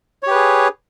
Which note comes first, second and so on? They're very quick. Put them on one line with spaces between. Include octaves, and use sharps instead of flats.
C#5 G4 B4 G#4